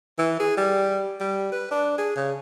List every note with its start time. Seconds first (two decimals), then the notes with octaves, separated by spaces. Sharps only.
0.19 E3
0.40 G#4
0.57 G3
1.20 G3
1.52 B4
1.71 D4
1.98 G#4
2.16 C#3